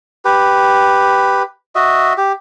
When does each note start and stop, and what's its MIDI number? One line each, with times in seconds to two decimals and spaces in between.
0.25 1.43 67
0.25 1.43 71
1.75 2.13 66
1.75 2.13 75
1.75 2.13 76
2.17 2.32 67